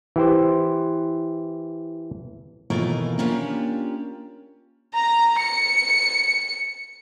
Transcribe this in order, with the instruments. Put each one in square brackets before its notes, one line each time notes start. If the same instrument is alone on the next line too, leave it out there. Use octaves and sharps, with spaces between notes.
[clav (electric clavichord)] E3 G4 C5
[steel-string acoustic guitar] D#2 B2 E3 A3 F4 A#4
A#3 C#4 D4 F4 G4
[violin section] A#5
C#7